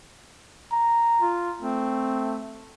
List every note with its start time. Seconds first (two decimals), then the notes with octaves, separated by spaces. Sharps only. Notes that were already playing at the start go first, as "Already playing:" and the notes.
0.72 A#5
1.21 F4
1.62 A3 C4